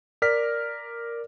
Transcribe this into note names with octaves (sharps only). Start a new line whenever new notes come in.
A#4 D5 F6 B6